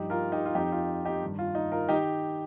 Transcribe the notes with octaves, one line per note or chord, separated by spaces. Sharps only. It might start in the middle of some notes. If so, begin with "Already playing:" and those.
Already playing: G2 F3 D#4 G4
F4 A#4
D#4 G4
F4
F2 F3 D#4 G4
F4
D#4 G4
G2 D#3
F4
D#4
F4 A#4
D#3 D#4 G4